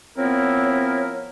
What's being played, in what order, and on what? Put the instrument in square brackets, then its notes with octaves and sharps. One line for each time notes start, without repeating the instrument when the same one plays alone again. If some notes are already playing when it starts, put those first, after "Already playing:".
[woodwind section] F3 B3 C4 E4 A#4 C#5